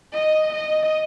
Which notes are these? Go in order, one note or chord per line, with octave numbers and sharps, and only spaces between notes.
D#5
D#5